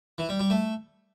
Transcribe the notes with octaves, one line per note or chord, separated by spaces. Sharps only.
E3
G3
G3
A3